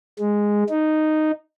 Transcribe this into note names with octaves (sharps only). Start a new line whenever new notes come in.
G#3
D#4